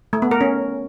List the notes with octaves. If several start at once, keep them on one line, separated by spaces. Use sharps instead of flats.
A3
B3
A#4
C#4